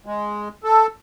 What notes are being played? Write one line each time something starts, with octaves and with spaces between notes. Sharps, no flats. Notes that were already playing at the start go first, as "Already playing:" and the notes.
G#3
A4